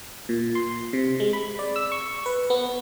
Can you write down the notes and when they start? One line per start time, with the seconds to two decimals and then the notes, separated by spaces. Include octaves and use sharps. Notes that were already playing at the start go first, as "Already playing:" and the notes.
0.29 A#2
0.55 C6
0.93 C3
1.20 G#3
1.33 B5
1.59 D5
1.76 E6
1.92 C#6
2.26 B4
2.50 B3